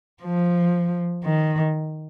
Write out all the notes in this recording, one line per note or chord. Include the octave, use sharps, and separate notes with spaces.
F3
D#3